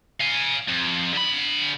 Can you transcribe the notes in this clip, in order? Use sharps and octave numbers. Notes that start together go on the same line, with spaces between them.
F5 G#5
F2
D3 B5